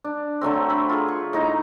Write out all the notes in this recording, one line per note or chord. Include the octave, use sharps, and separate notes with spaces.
D4
D3 F#3 A3 C4
B5
F4 G#4
C#6
A2 D#4 A#5